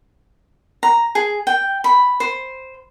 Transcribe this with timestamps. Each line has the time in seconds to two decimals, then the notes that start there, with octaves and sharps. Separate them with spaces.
0.83 A#5
1.15 G#4
1.47 G5
1.84 B5
2.20 C5